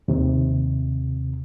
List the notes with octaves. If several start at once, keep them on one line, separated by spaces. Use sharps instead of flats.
D#2 C3